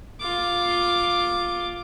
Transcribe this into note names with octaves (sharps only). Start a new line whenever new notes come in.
F4 D6